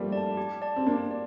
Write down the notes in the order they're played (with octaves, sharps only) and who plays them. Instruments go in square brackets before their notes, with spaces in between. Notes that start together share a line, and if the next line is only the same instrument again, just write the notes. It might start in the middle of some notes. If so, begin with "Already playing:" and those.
Already playing: [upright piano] F3 G3 A3 A#3
[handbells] D5 A5
G4
D5 A5
[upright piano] C4
[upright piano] A#3 D4 [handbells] G4
[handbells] D5